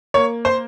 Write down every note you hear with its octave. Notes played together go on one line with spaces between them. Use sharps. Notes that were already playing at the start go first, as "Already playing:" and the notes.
A#3 C#5
C5